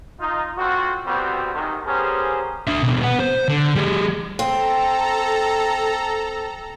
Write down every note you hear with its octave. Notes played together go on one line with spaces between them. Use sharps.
D#4 F4
D3 C4 F4 F#4
D2 G3 B3 C4 F#4
E2 G#2 C3 D#3
B3 C#4 G4 G#4 A#4 C5
D4 E5
B2 D4
B3 F#5
C5
D3
G3 G#4
C4 A4 A#5